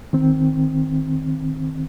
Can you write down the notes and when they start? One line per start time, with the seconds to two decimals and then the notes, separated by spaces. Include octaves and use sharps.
0.13 D#3 C4